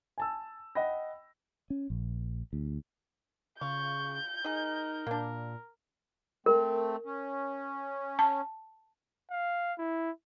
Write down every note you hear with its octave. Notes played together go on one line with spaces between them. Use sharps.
G#5 A5 E6
D#5 F#5 G5 B5 A#6
C#4
A#1
D2
C#3 F4 C#6 G6
D#4 G#4 A#4 D#5
A#2 A#3 D4
A3 C4 A#4
C#4
A5
F5
E4